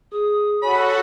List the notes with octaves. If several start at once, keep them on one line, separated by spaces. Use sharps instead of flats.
G#4 D#6
F#4 A4 C#5 F#5 G#5 B5